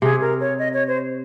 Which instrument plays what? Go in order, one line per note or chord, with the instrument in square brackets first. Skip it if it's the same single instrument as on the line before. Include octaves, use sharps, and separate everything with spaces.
[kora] C3 [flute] G#4
[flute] A#4
C#5
D#5
C#5
C5